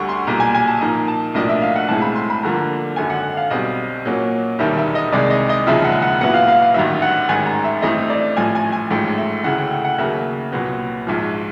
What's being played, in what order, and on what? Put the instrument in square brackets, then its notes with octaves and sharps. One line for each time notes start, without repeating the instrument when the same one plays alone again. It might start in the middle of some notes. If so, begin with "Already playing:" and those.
Already playing: [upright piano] D2 D3 G3 C#6
C6
B1 A#2 G3 A#5
G#5
G#5
A5
A#2 F3 A#3 D#4 A#5
A5
B1 A2 F3 A#3 D4 D#5
E5
F5
F#5
B1 A2 E3 G#3 C4 A5
B5
C6
B5
G2 D3 F3 A#3 A#5
G#1 F#2 D3 G#5
F#5
F5
B1 B2 G3 C4 D#5
A#2 F#3 A#3 C#4
E1 D#2 D#3 G3 A#3 E5
E5
D#5
C2 C3 D#3 G#3 D5
D#5
D#5
E1 D#2 C#3 F3 G#3 E5
F#5
F#5
A#2 F#3 B3 E4 F#5
F5
F5
F5
A1 G2 D#3 F#3 E5
F#5
A1 G#2 D#3 G#5
A#5
E5
A1 G2 E3 A3 C4 D#5
D5
A1 A2 F3 G#5
G#5
G#5
A1 G#2 F3 A3 G5
E5
D2 C#3 E3 A3 F#5
G5
G5
F#5
D#2 C#3 F#3 A#3 E5
C2 A#2 F#3 B3
A#1 G#2 F3